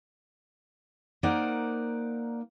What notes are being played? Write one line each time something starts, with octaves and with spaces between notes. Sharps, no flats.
A#3 D#4 A#4 C5 D5 F#5